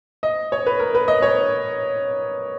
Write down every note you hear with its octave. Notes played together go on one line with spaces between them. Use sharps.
D#5
C#5
B4
A#4
B4
D#5
C#5